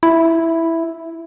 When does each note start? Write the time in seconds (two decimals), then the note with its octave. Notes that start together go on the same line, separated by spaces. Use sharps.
0.03 E4